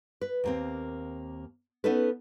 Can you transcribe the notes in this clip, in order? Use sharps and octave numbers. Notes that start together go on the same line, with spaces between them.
B4
D#2 A#3 C4
B3 C#4 D#4 A4 B4